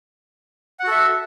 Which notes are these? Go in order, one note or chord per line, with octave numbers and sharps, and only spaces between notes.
F#4 A4 E5 F#5